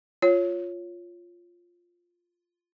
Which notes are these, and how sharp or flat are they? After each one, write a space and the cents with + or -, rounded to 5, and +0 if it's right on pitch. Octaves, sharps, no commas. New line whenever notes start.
F4 +0 C#5 +0